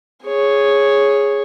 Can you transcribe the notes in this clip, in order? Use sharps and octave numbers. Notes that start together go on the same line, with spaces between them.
G#4 C#5